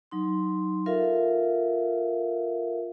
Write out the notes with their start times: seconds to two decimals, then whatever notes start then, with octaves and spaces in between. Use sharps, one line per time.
0.11 F#3 D#4 C6
0.86 F4 A4 A#4 E5 F5